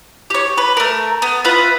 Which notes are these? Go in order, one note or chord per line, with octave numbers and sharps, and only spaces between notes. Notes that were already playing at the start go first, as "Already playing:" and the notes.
G4 C#5
B4
A3 A#4
B3
F4 B4 E5 F#5